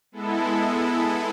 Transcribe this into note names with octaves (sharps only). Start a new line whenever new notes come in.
G#3 B3 E4 A4